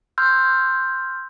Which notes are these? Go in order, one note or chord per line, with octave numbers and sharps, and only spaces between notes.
C6 E6 F6 G6